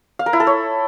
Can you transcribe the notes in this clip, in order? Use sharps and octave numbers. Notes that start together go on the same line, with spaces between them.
F5
A#4
E4
A4
C#5